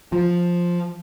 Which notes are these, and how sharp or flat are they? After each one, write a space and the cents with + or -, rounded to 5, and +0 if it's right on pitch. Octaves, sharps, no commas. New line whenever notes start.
F3 +5